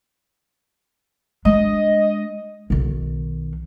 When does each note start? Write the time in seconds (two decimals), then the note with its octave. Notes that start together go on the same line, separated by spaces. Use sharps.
1.45 G#3 D4 D#5
2.70 B1 D#3